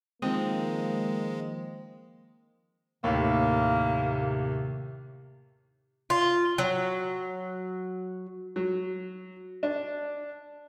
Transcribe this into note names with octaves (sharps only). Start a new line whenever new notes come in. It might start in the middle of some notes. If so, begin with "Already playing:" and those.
D#3 F3 G#3 A#3 C4 D#6
D#2 A2 C3 A#3
F4
F#3
F#3
D4